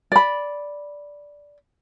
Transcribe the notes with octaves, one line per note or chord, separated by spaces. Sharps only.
D5 B5